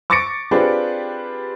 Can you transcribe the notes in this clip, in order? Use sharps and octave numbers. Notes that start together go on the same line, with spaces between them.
C#6 D6 A6 A#6 C#7 D7
C4 D4 F4 G4 G#4 B4